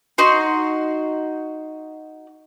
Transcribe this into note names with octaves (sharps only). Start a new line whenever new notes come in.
D#4 F#4 C6